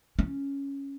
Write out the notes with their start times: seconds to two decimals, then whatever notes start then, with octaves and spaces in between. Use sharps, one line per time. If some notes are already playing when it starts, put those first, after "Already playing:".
0.19 C#4